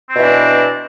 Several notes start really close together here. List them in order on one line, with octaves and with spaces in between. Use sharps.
C4 B2 E3 D4